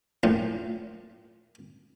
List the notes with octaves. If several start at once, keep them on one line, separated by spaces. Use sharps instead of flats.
A#1 A2